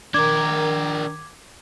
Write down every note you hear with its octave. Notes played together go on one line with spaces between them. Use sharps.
D#3 D4 A#4 D6 G#6